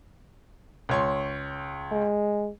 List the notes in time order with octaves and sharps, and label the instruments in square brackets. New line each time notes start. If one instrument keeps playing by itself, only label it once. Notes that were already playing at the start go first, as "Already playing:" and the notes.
[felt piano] C#2 C#5 C6
[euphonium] G#3